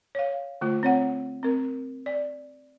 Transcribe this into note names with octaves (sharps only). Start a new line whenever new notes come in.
C#5 F5
D3 A3 F4
C4 C#5 F#5
C4 A#4
D5